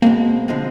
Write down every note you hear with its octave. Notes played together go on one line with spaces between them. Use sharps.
B2 G#3 A#3 C4
D3 F3 G#3 C4